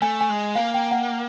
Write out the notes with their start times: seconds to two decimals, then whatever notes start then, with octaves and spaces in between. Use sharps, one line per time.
0.02 A3 G#5
0.21 G#5
0.29 G#3
0.55 A#3 F5
0.74 G5
0.91 F#5